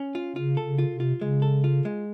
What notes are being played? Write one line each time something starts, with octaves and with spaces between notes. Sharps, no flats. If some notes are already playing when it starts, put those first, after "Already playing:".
Already playing: C#4
F4
C#3 F4
A4
C#3
F4
C3
F4
C#3 G#3
A4
F4
G#3